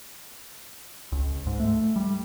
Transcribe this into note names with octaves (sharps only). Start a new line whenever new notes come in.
C#2
G#2
A3
G3